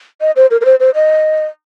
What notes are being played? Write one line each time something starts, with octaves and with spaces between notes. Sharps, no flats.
D#5
C5
A#4
A#4
C5
C5
D#5